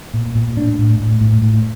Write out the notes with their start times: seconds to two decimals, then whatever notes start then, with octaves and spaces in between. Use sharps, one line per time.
0.14 A#2
0.35 A#2
0.57 A2 D4
0.78 A2
1.00 A2
1.21 A2
1.42 A2